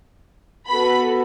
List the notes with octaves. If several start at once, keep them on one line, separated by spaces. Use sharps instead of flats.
B3 F#4 A4 B5